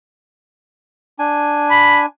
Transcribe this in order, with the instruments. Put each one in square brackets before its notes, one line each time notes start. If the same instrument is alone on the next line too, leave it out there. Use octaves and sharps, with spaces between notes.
[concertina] D4 G#5
[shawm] B5